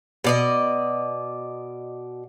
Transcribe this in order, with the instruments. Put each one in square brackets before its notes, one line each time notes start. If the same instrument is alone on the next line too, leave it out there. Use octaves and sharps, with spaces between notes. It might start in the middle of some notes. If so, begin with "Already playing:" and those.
[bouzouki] B2 D5 D#5